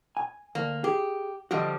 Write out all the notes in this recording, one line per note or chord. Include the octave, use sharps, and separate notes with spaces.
G#5
D2 A#3
G4 G#4
D3 F3 G3 F#4 D#5